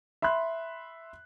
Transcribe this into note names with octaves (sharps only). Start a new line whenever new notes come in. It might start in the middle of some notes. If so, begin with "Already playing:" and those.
E5 B5 C6 F#6